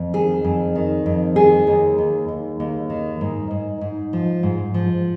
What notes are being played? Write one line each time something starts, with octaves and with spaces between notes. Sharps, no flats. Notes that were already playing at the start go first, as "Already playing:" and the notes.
Already playing: F2
D#3 G#4
F2
D#3
F2
D#3 G#4
D#2
D#2
D#2
D#2
D#3
G#2
G#2
G#2
F3
G#2
F3